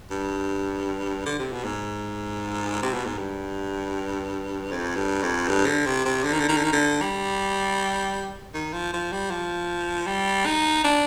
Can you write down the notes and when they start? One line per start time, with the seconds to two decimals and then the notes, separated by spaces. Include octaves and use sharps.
0.10 G2
1.26 D3
1.39 C3
1.52 B2
1.64 G#2
2.82 C3
2.93 B2
3.05 G#2
3.18 G2
4.71 F2
4.96 G2
5.22 F2
5.48 G2
5.66 D3
5.86 C3
6.05 C3
6.24 D3
6.33 D#3
6.39 D3
6.48 D#3
6.56 D3
6.64 D#3
6.72 D3
7.01 G3
8.54 D#3
8.73 F3
8.93 F3
9.12 G3
9.31 F3
10.07 G3
10.46 D#4
10.84 D4